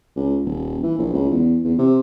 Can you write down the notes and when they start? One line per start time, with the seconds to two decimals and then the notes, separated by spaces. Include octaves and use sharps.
0.16 C#2
0.45 D#1
0.83 E3
0.98 A#1
1.14 C#2
1.30 E2
1.64 E2
1.78 C3